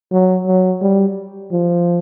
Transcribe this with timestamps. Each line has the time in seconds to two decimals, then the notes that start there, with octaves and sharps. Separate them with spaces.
0.12 F#3
0.47 F#3
0.82 G3
1.51 F3